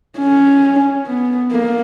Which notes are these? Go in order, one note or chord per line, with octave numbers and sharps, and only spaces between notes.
C#4
B3
A#3